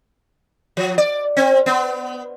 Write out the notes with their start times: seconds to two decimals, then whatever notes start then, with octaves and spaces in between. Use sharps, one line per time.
0.77 F3
0.98 D5
1.37 C4
1.66 B3